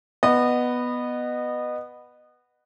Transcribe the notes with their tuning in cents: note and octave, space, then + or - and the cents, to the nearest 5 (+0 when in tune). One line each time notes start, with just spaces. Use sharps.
B3 +0 D#5 -25